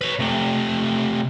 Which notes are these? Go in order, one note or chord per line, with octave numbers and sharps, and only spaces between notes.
B4 C#5
C3 A3